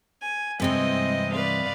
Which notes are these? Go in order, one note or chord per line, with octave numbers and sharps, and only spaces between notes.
G#5
G2 C3 E3 G#3 C4 D#5
B4 D5 F5